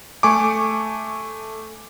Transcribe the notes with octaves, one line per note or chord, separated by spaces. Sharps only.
A3 G#5 C#6 D6